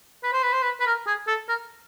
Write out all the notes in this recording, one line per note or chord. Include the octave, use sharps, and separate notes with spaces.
B4
C5
B4
C5
B4
B4
A#4
G#4
A4
A#4